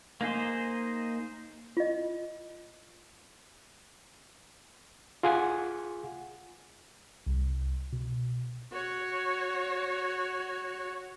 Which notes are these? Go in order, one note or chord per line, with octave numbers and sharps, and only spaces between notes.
A#3 D#4 G#4 C5
F4 D#5
F4 G#4 F#5 G#5
C2
B2
F#4 C#5